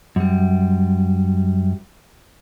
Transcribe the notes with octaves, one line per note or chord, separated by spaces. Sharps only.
F#2 G3